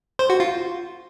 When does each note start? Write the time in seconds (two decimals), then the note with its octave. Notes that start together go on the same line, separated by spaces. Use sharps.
0.19 C5
0.30 F#4
0.40 F4